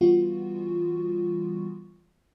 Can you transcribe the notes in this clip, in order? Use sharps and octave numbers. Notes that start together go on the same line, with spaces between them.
E3 G3 B3 F4 F#4